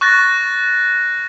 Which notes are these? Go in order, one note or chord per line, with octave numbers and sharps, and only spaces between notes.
C#6 F#6 A6 A#6